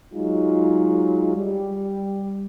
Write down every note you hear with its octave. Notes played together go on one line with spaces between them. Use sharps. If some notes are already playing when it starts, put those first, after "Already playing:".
F#3 G#3 D#4 F4
G3